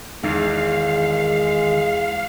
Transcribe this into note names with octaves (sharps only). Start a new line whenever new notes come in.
E2 D#3 G#3 F5